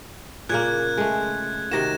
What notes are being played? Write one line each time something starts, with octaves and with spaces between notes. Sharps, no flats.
A#2 C#3 A#3 F#6 G#6
G#3 A3
C3 D#3 F#4 A#6 E7